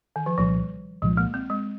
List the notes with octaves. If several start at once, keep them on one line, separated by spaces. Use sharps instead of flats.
D#3
F3
C2 A#2 F3 G3
C2 A#2 F3 G#3
A#3
C4
G#3